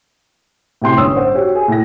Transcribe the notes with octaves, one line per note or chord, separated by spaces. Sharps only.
A2 C3 G5 C6
G1 C#4 C#5 D#6 E6
C5 F#5
F#4 G4 C#5
G#4
A2 A#6